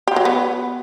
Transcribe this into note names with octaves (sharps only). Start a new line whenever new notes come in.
G4
F#3
B3